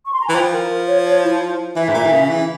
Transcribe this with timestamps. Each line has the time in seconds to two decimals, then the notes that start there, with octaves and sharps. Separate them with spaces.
0.05 C#6
0.13 C6
0.20 A#5
0.28 E3 G#5
0.34 F3 G5
0.53 A#4
0.87 C#5
1.06 C#5
1.24 E4
1.40 F4
1.76 E3 E5
1.89 G#2
1.94 A#2
2.06 E3
2.12 C#3
2.29 E3